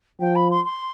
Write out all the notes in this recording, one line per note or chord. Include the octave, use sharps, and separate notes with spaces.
F3 G5
B5
C6
C6